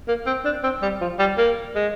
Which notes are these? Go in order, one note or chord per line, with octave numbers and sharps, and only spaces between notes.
A#3
C4
D4
C4
G3
F3
G3
A#3
G#3